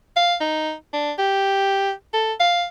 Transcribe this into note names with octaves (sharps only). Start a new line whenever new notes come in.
F5
D#4
D4
G4
A4
F5